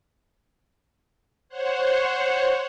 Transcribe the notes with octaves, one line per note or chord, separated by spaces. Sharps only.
C5 C#5 F#5